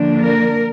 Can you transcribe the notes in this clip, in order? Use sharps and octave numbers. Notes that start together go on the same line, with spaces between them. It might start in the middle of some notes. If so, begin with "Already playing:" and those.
Already playing: D3 F3 A#3 D4
A#4